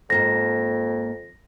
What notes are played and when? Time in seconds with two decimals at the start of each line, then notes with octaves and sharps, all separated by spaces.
0.10 F2 G#2 A#3 A5 A#6